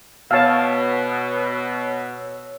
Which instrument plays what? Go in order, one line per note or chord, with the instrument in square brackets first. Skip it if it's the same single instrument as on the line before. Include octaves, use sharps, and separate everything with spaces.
[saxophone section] B2 [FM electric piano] C#5 E6 [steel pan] F5 A5